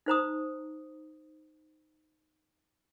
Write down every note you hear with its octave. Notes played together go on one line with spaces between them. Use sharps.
D#4 C5 A#5 D#6